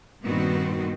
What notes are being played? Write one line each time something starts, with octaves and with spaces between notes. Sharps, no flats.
G2 A#2 D#3 B3 C4 F#4